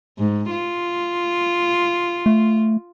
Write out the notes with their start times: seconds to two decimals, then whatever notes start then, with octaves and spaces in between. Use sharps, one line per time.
0.19 G#2
0.51 F4
2.26 A3